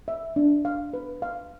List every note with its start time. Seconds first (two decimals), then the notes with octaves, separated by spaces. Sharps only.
0.08 E5
0.36 D4
0.65 F5
0.94 B4
1.22 F5